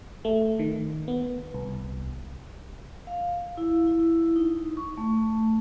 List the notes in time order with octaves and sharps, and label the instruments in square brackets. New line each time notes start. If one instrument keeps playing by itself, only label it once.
[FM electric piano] A3
D#3
B3
C2
[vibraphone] F5
E4
E4
D#4
C#6
A3